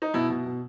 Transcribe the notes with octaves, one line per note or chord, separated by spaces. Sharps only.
D#4
B2 E4
B2
B2